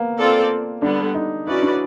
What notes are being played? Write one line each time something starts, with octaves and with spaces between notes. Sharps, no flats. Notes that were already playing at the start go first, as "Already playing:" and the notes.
Already playing: A#3 B3
C4 F4 A4 D5
D3 G3 B3 D4
D#4
C#4 E4 F#4 B4 D5
D4